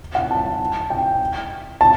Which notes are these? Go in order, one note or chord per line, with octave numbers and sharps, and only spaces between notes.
F#5
A5
G5
A5